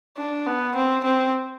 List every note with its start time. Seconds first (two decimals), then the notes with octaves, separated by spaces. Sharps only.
0.17 D4
0.46 B3
0.75 C4
1.04 C4